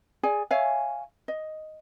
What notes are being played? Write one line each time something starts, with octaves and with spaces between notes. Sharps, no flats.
G#4 D5 G#5
C#5 E5 F5 G#5
D#5